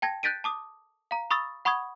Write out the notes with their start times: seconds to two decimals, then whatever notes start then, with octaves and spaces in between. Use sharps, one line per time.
0.02 G5 A5 G#6 A#6
0.23 F#6 G6 A6 B6 D7 D#7
0.44 A5 D6 D#6
1.11 F5 A#5
1.31 B5 C#6 D#6 E6 A6
1.65 F#5 B5 C#6 D#6 G#6